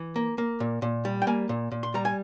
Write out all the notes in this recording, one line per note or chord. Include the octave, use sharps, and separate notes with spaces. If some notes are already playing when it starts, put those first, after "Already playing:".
Already playing: E3
A#3
A#3
A#2
A#2
G3
G5
A#3 G#5
A#2
A#2
C6
G3 A#5
G#5